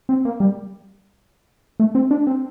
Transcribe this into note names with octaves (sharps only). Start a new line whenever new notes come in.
C4
A#3
G3
A3
C4
D4
C4